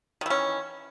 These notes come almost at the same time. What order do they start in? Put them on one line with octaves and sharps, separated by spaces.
D#3 E3 C#4